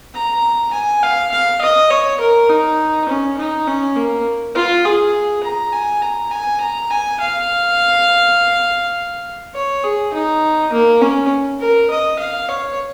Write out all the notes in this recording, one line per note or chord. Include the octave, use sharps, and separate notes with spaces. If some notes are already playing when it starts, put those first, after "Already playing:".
A#5
G#5
F5
F5
D#5
C#5
A#4
D#4
C#4
D#4
C#4
A#3
F4
G#4
A#5
G#5
A#5
G#5
A#5
G#5
F5
C#5
G#4
D#4
A#3
C#4
A#4
D#5
F5
C#5